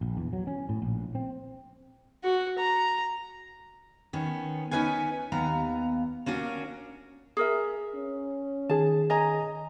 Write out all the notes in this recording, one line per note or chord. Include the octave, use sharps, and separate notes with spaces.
A#1
E2
F#3
C#4
A2
A#1
C4
F#4
A#5
D#3 B3 C#4
B3 C#4 D#4 B4 F5 G#5
D#2 B3 F5 A#5
A#3 C#4 D4 F#4
G#4 A#4 E5
C#4
D#3 G#4 A5
D#5 G#5 A#5